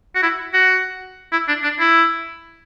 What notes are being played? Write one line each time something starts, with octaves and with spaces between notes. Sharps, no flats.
F#4
E4
F#4
E4
D4
D4
E4